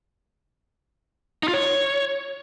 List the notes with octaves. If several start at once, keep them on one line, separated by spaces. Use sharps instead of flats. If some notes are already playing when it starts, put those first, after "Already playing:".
D#4
F4
C#5